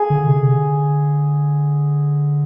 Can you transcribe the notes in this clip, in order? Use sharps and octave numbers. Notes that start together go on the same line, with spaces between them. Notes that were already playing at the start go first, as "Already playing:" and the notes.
Already playing: G#4
D3
C3
D3